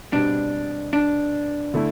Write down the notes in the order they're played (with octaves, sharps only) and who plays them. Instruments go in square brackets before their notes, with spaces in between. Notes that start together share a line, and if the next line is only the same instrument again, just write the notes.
[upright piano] B2 G3 C4 [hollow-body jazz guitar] D4
[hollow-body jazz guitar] D4
[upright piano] D3 A3 E4